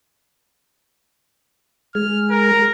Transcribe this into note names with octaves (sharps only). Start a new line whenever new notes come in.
G#3 G#4 F6
A#4